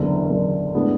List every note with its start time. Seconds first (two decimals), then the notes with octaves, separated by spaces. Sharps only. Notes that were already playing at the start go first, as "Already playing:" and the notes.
Already playing: F#1 E2 D3
0.30 F#1 E2 D3
0.75 A2 G#3 B3 D4